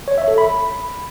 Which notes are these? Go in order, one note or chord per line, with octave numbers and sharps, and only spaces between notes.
C#5
E5
A4
B5